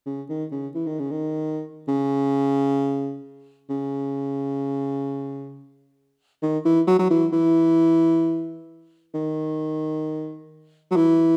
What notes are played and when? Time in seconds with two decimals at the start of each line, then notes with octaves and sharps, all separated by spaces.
0.06 C#3
0.29 D#3
0.52 C#3
0.75 E3
0.87 D#3
0.99 C#3
1.11 D#3
1.88 C#3
3.70 C#3
6.43 D#3
6.65 E3
6.87 F#3
6.99 F#3
7.10 E3
7.33 E3
9.14 D#3
10.91 F#3
10.96 E3